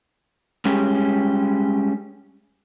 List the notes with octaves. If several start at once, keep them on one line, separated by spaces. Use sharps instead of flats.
G3 G#3 C#4 G4